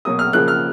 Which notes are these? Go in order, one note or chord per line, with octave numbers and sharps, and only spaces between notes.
B2 F#3 A#3 D#6
F6
C#3 F3 A#3 F#6
F6